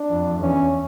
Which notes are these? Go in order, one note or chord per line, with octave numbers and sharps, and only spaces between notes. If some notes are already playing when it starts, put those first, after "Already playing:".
Already playing: D4
F2
E2 C#4